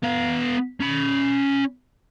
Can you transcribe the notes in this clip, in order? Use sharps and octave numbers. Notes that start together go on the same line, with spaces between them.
B3 F5
C#4 B5